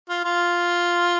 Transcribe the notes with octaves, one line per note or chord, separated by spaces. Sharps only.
F4
F4